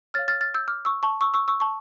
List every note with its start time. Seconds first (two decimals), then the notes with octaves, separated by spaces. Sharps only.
0.14 C#5 F5 F6 A6
0.28 F6 A6
0.41 F6 A6
0.54 E6 G6
0.68 D6 F6
0.85 C#6 E6
1.03 A5 C#6
1.21 C#6 E6
1.34 C#6 E6
1.48 C#6 E6
1.60 A5 C#6